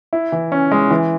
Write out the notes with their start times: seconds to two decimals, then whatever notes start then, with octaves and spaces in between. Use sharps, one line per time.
0.13 E4
0.32 E3
0.52 C#4
0.71 G#3
0.90 E3